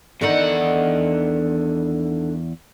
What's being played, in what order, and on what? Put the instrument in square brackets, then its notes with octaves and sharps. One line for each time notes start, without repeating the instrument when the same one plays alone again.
[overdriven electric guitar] E2 F#5 [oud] D3 D#3 D#4